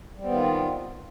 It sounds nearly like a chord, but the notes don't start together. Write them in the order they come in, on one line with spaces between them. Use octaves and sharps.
G3 C4 B3 D#3 F4